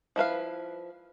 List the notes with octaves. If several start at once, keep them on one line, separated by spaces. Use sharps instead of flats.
F3 E4 B4 F5